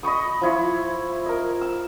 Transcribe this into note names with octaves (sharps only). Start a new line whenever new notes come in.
D#5 B5 C#6 D#6
F3 E4 C#6
A#4 D#5
E6